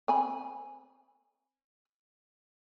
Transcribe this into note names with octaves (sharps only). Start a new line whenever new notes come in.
C4 G#5 B5